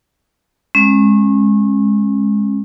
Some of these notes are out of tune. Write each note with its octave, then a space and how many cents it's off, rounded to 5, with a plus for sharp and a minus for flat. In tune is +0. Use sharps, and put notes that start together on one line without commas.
G#3 +0 C#4 -35